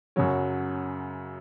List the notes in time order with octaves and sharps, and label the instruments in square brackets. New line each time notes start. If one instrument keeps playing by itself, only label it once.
[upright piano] F#2 C#3 F#3 C#5